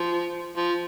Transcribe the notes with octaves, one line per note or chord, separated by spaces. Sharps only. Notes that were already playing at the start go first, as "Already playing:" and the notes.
Already playing: F3
F3